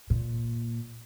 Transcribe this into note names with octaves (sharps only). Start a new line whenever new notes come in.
A#2